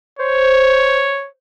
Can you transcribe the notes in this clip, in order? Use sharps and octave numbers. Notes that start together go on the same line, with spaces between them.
C5 C#5